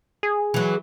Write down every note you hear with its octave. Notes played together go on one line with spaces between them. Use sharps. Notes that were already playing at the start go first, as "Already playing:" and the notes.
G#4
E3 F#3